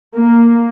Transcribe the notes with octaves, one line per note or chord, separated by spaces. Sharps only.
A#3